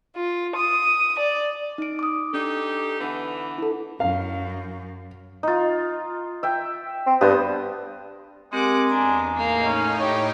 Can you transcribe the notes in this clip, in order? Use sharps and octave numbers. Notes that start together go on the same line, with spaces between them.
F4
D#6
D5
D#4 D7
D6 D#6
D4 D#4 G4 A4
D3 E3 B3
E4 A4
F#2 F5
D#4 F4
E5 G5
C4
G2 B3 C5 D#6
G#3 C4 G4 A#4 F#5 D6
E2 D4 G#5 A#5
A2 A#3 D#4 F5
C#4
G4 C#5